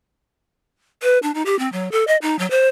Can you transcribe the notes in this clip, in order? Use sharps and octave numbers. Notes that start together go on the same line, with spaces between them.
B4
D4
D#4
G4
C4
F#3
A4
D#5
D#4
F#3
C5